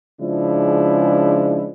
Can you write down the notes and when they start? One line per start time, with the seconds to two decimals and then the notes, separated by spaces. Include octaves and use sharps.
0.21 C#3 F3 G#3 D4 E4